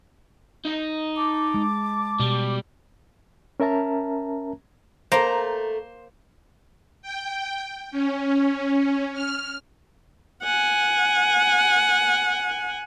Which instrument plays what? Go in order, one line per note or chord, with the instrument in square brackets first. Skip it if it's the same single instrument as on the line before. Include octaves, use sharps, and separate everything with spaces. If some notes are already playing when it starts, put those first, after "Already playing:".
[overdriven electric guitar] D#4 D#5
[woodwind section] A5 D6
[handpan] G#3
[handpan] B2 [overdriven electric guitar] G3
[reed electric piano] C#4 A#4 E5 A5 A#5
[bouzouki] A3 A#5 [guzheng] A#3 [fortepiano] C5
[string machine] G5
C#4
F6
[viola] F#5 G#5